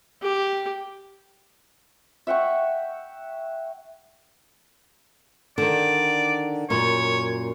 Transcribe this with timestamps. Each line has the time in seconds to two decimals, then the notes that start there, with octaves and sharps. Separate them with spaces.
0.22 G4
2.27 E5 F#5 G5 C#6
5.58 D3 D#3 D5
6.70 F#2 A#2 C#5